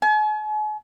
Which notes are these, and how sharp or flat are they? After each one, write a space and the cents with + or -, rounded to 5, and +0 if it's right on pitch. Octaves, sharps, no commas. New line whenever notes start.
G#5 +45